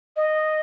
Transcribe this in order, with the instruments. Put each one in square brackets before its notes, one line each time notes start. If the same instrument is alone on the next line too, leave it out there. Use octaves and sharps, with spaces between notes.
[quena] D#5